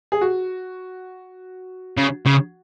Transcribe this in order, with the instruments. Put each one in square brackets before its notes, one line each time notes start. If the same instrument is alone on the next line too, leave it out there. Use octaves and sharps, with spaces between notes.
[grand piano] G#4
F#4
[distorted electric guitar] C#3
C#3